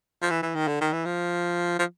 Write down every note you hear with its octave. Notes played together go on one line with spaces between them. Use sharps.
F3
E3
E3
D#3
D3
D#3
E3
F3
F3